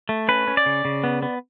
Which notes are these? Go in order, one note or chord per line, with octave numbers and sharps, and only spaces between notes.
A3
C#4 B4
C#4
D5
C#3
C#3
B3
B3